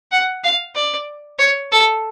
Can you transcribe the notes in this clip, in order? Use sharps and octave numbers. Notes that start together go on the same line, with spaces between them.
F#5
F5
D5
C#5
A4